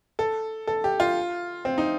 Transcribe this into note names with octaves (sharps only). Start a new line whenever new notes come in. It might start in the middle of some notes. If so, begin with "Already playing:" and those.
A4
A4
G4
F4
C4
D#4